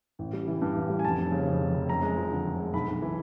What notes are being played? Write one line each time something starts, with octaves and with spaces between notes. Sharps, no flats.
A1
G3
E3
G2
A1
G3
G#5
F1 A5
F1
C#3
F2
F1
F1
F#2 A#5
G#3
F3
D3
F#2
G#3
B1 B5
B1
E3